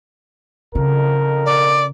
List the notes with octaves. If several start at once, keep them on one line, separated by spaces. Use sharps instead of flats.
F2 C#3 A#4
D5